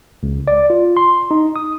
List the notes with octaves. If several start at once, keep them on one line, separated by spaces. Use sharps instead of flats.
C#2
D5
F4
C6
D#4
D#6